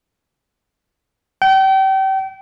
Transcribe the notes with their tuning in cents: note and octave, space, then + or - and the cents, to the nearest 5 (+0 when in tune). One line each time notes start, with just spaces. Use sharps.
G5 -35